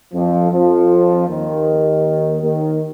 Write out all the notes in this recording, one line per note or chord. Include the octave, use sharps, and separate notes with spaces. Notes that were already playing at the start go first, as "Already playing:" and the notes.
F2 F3
F2 F3
D#2 D#3
D#2 D#3